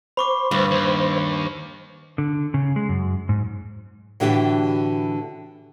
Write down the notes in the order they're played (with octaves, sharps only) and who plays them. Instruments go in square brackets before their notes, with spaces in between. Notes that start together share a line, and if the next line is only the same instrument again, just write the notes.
[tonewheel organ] C5 [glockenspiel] B5 C#6 D6
[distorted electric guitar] D2 [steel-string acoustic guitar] G2
[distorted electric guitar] D#2
[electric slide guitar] D3
C#3
G#3
F#2
G#2
[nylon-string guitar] A2 D3 E3 D4 F#4 G4